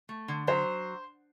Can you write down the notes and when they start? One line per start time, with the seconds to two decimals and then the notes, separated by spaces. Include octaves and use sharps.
0.09 A3
0.28 D3
0.47 F#3 C5